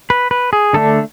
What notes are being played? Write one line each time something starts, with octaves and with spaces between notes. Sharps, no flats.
B4
B4
G#4
D3 A3 D4 A4